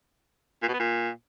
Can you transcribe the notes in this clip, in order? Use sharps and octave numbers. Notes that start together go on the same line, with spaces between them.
A#2
B2
B3
A#2